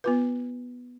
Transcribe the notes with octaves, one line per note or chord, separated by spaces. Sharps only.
B3 F4 B4